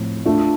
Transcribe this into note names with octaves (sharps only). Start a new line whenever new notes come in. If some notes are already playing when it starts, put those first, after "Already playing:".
Already playing: A2 F3 C4 F4
A3 D4 F4